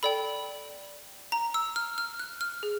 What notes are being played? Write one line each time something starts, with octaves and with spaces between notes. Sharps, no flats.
A4 D5 G5 B5
A#5
E6
F6
F6
F#6
F6
G#4